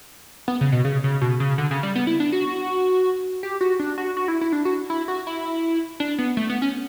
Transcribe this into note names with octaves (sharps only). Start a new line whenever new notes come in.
B3
C#3
B2
C#3
C#3
B2
C#3
D3
C#3
G3
B3
E4
D4
F#4
G4
F#4
D4
F#4
F#4
E4
E4
D4
F#4
E4
F#4
E4
D4
B3
A3
B3
C#4